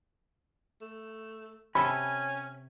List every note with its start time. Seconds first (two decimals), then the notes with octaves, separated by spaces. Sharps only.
0.81 A3
1.75 C3 C#4 A4 G#5 B5